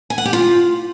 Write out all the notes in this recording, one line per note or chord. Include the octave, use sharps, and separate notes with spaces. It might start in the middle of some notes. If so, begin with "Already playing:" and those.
G#5
F#5
G4
F4